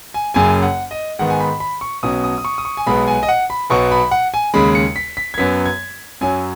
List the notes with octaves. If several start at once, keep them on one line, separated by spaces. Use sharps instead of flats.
G#5
F#1 F#2 C#3 G#5
F#5
D#5
G#2 D#3 B3 F#5
G#5
B5
B5
C#6
B1 B2 F#3 C#4 D#6
D#6
D#6
C#6
D#6
C#6
G#5
B1 B2 G#3 B3 B5
G#5
D#5
F#5
B5
B1 B2 F#3 B3 C#6
B5
F#5
G#5
D#2 C#3 G#3 B5
C#7
B6
B6
G#6
F#2 F#3 B3 B6
G#6
F#2 F#3 C#4 G#5